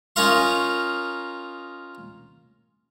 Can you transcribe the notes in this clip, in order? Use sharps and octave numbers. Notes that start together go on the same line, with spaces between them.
C#4 D#4 F4 A#4 F5 C6